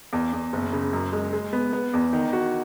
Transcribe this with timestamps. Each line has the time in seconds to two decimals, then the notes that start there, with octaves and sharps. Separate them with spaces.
0.13 E2
0.33 E2
0.53 F#1
0.73 C#3
0.93 F#2
1.13 G#3
1.33 G#3
1.53 B3
1.73 B3
1.94 E2
2.13 D#3
2.33 F#4